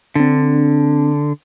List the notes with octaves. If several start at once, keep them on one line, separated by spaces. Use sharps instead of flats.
D3 C4 D4